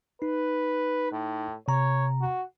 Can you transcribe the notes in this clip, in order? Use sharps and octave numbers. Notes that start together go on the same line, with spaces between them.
D#4 B4
A2
C3 C#5 A#5
F#4